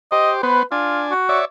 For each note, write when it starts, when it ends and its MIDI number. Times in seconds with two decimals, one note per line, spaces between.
0.12 0.42 67
0.12 0.42 72
0.12 0.31 75
0.43 0.63 59
0.43 0.63 71
0.43 0.63 72
0.72 1.14 62
0.72 1.04 65
0.72 1.14 80
1.11 1.40 66
1.29 1.45 73
1.29 1.45 74
1.29 1.45 76